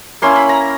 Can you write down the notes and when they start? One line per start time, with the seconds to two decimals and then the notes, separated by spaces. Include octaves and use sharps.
0.22 A#3 C#4 E4 C6
0.36 B5
0.49 A#5